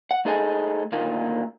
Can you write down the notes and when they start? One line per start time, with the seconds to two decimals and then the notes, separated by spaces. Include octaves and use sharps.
0.11 F#5
0.25 A3 D#4 G#4 A4 D#5 G#5
0.92 D2 A#2 D#3 A#3